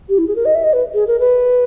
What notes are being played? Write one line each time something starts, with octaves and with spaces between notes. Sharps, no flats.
G4
E4
G#4
A#4
D#5
E5
D#5
B4
G#4
A#4
B4